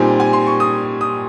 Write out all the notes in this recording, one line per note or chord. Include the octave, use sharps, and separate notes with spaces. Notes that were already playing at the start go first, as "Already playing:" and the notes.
Already playing: A#2 G3 C4 D#4 G#5
G#5
C6
C#6
D#6
D#6